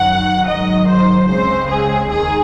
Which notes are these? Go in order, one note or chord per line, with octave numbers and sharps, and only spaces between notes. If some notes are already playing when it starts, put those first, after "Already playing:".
Already playing: F#2 D#3 F#3 F#5
G#2 D#3 F#3 D#5
C5
C#2 C#3 G#3 C4 C5
G#4
D#2 D#3 G#4